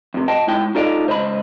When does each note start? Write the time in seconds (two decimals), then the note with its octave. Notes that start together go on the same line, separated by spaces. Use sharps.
0.14 F2 C3
0.28 D#5 G5 A5
0.47 G#2 E4 G5
0.75 D#4 F4 A4 D5 D#5 F5
1.07 C#2 C5 D#5 A#5 B5